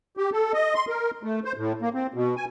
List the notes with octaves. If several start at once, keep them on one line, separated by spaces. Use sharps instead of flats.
G4
A4
D#5
C6
A#4
A3
C5
A2
A#3
C4
B2
G#5